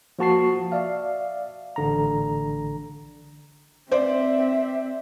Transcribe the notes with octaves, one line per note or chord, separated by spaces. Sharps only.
F3 A#3 F#4 A5 C#6 C7
D5 E5 F5
A1 D3 A#5
C4 C5 D5 E5